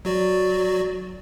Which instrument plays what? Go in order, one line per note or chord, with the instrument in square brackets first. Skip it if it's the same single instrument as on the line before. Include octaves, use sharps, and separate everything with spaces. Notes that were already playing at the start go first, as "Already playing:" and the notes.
[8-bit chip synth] F#3 F#4 D5